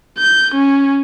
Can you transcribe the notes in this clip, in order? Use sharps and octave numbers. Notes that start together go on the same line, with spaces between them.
G6
C#4